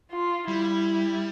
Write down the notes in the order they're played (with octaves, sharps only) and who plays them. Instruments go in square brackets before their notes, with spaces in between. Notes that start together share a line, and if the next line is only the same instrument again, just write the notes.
[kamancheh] F4
[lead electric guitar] G3 [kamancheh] E4